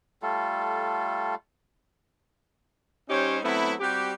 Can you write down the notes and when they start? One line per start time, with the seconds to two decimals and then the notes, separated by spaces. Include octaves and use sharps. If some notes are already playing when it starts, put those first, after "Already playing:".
0.22 G3 A3 F4 A4
3.09 G3 C#4 D#4 G4 C5 C#5
3.43 F#3 A3 B3 C4 E4
3.80 G3 C4 F#4 G4